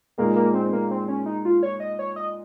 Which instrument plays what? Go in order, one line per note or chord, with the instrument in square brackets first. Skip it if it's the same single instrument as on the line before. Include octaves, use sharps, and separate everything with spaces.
[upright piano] A#2 G#3 D#4 G#4 [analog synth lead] A#3
[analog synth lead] A#3
C4
A#3
C4
C#4
D#4
F4
C#5
D#5
C#5
D#5